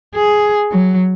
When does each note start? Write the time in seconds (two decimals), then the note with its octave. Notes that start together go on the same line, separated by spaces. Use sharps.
0.15 G#4
0.71 F#3